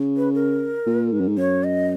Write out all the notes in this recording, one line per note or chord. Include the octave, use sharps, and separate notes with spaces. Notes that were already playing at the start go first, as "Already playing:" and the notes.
Already playing: C#3
B4
A#4
A#2
G#2
F#2
G#2
F#2 C#5
D#5